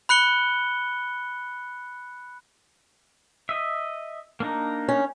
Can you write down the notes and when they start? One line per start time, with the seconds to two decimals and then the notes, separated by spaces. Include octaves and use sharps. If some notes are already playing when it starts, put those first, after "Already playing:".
0.09 B5 F#6 C#7 G7
3.49 D#5 E5
4.40 A#3 D4 D#4
4.89 C#4